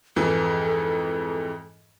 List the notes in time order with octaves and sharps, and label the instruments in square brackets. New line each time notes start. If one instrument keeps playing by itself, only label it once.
[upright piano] F2 G#2 E3 [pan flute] A4